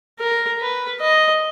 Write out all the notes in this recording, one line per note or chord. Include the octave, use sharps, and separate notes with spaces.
A#4
B4
D#5